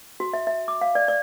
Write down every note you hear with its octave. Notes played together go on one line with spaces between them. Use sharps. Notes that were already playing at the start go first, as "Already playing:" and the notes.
F#4
E5
E5
D6
F5
D5
D5